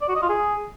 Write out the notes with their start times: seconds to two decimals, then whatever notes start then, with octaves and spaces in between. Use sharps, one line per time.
0.02 D5
0.09 F#4
0.15 D#5
0.22 F4
0.29 G#4